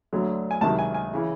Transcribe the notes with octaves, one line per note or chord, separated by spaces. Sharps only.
D2 D3 F#3
G#5
C#2 C3 D#3 F#3 A5
G#5
G#5
C#3 E3